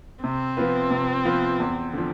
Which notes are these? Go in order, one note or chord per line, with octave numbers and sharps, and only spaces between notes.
C3 C4
F3 B3 F4 B4
C3
F3 B3 F4 B4
E2
D3 F3